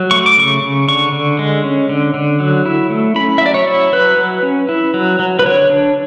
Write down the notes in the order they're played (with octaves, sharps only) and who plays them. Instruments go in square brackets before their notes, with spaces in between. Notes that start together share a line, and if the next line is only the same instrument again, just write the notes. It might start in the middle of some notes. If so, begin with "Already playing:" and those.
Already playing: [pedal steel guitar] F#3
A3 C#6
D6
C#3 C#6
C#3
D3 C#6
D3
G#3
C#4
D3
D3
F#3
E4
A3
C#4 B5
E5
F#3 D5
C#5
E4
F#3 B4
F#3
C#4
E4
F#3
F#3
B4
D3 C#5
D4